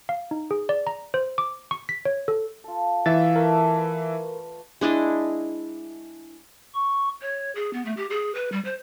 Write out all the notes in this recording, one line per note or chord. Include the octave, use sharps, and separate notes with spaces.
F5
D#4
G#4
D5
A#5
C5
D6
C#6
B6
C#5
A4
F4 A4
E3 D5 E5 F5 C#6 A6
A3 A#4
B4
G#3 D4 E4 D#5
C#6
C#5
G#4
B3
A3
G4
G#4
B4
G3
C5